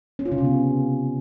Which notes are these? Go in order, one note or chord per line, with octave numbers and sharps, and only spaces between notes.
C#4
F4
C#3
C3
B3